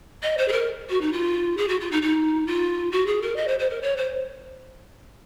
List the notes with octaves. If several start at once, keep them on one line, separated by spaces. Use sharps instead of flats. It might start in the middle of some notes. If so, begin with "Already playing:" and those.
D#5
C5
G#4
A#4
F#4
D#4
F4
G#4
F#4
F4
D#4
D#4
F4
F#4
G#4
A#4
D#5
C5
C5
A#4
C#5
C5